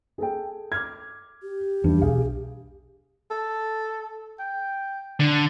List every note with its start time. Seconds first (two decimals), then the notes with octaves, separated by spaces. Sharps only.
0.18 G#4 A4 G5
0.72 D6 F6 G#6
1.43 G4
1.84 E2 G2 G3
2.01 B1 G#4 F5
3.31 A4
4.39 G5
5.20 D3